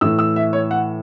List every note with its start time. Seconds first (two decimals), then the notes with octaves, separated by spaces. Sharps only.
0.01 A2 E3 E6
0.19 E6
0.36 E5
0.53 C#5
0.71 F#5